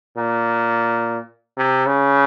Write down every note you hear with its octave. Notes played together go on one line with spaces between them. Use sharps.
A#2
C3
C#3